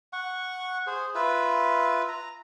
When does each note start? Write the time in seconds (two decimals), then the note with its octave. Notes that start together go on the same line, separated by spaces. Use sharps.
0.13 F#5 C#6
0.87 G#4 C5
1.15 F4 B4 E5
2.08 A#5